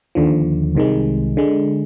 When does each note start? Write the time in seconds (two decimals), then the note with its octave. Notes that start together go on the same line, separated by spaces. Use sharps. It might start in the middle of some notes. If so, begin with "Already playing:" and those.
0.15 D#2 D3 F3
0.75 C2 C3 D#3 G#3
1.37 D3 G#3